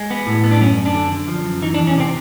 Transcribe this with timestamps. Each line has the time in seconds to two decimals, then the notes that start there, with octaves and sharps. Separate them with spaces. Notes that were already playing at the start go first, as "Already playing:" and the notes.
Already playing: G#3
0.10 B3
0.27 A2
0.44 B3
0.51 D4
0.61 F#2 C#4
0.78 F#2
0.86 D4
0.94 D3
1.11 D3
1.28 F3
1.45 F#2
1.62 E3 D#4
1.74 D4
1.79 E2
1.87 C#4
1.95 C3 C4